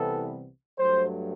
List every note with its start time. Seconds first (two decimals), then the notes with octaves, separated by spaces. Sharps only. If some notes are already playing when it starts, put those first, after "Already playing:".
Already playing: C2 C3 E3 G3 B3 A4
0.78 G2 F#3 A3 C5